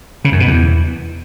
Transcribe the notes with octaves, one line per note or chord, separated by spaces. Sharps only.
C#3
F#2
B2
E2